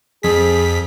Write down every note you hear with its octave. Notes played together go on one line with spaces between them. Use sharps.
F2 G#4 B6